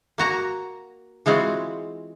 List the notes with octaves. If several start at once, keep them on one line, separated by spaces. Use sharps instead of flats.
A#3 F#4 A#5
E3 G#3 C4 F4 F#4